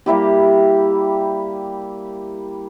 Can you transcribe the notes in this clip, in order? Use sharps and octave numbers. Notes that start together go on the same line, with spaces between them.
G3 A#3 E4 G4